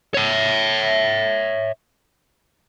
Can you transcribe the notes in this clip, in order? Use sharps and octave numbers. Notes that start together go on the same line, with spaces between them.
C#5 E5